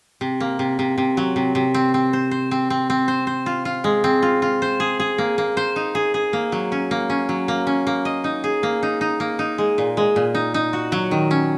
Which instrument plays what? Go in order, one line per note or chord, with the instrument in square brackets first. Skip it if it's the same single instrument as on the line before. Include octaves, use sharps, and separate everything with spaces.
[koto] C3
A#3
C3
C3
C3
F#3
C3
C3
C4
C4
C5
C5
C4
C4
C4
C5
C5
F4
F4
G#3
C4
F4
F4
C5
G#4
G#4
A#3
A#3
C5
D#4
G#4
G#4
A#3
F#3
C#4
A#3
C#4
F#3
A#3
C#4
A#3
D#5
D#4
G#4
A#3
D#4
D#4
A#3
D#4
G#3
A#2
G#3
A#2
D#4
D#4
F#4
F#3
D#3
C#4